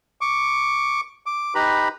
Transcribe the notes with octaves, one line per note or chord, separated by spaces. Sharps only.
C#6 D6
D6
D#4 G4 B4 A#5 B5